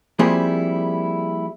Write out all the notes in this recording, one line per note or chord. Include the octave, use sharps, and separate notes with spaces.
F3 G3 A#3 C4 E4 G#4